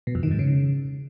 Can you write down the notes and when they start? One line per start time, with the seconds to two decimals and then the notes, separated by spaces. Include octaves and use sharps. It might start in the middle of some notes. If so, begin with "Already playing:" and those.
0.07 B2
0.15 F2
0.23 D#3
0.31 G#2
0.39 C#3